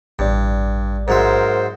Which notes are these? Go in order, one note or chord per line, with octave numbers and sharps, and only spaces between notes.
A1 G2 D5
G#2 F#3 A#4 C5 E5